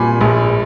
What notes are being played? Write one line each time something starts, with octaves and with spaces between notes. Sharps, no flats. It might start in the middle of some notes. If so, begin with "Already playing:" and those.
Already playing: A#2 G3 G#5 B5
A#1